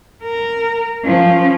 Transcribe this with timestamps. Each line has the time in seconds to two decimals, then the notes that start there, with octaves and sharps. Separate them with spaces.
0.23 A#4
1.05 F3 C#4